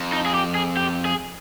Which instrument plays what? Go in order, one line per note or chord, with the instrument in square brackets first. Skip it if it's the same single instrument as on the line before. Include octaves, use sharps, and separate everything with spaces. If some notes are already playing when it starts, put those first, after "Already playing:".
Already playing: [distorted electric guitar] F2
[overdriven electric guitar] D#4
G#4
G4
G#4
G4
G#4